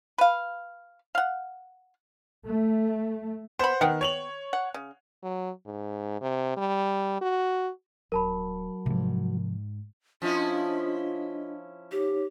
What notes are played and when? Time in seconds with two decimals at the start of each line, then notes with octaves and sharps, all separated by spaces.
0.18 B4 F5
1.15 F5 F#5
2.46 A3
3.59 B3 C5 F#5 B5
3.81 D#3 B3 F#5 G5
4.01 C#5 F7 F#7
4.53 F#5
4.74 C#3
5.23 F#3
5.66 G#2
6.22 C3
6.57 G3
7.21 F#4
8.12 D#1 F#3 A#4 A5 B5
8.86 G#2 C3 F3
10.22 F3 C#4 D4 E4 F4 D#5
11.92 D#4 G4 C#5